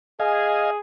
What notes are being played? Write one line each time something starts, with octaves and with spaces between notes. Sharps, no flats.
G#4 D#5 F5 G#5